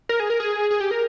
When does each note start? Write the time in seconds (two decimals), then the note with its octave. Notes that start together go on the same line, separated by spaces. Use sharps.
0.09 A#4
0.20 G#4
0.30 A#4
0.40 G#4
0.71 G#4
0.80 G4
0.91 A#4